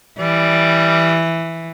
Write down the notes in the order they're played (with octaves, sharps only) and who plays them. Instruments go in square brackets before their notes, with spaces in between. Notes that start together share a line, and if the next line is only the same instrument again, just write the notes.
[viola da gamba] E3 [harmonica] G3 D5